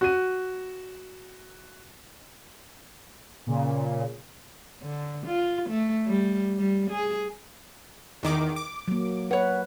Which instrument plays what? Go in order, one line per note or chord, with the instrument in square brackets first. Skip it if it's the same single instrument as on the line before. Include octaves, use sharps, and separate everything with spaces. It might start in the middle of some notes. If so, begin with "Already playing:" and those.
[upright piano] F#4 D#7
[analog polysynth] A#2 C#3
[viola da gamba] D3
F4
A3
G3
G3
G#4
[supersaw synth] E2 D#3 D6
D6
[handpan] F#3 A#3
[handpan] B4 [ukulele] C#5 F#5